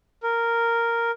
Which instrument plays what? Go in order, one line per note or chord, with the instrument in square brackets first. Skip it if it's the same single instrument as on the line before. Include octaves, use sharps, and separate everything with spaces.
[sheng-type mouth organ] A#4